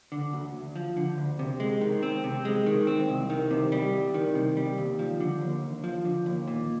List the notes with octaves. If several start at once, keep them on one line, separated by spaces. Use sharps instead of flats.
D3
D2
D2
F3
D3
D2
C3
G#3
D#3
C4
C3
G#3
D#3
C4
C2
D#3
C3
G3
C2
D#3
C3
G3
D#2
F3
D3
D#2
D#2
F3
D3
D#2
A#2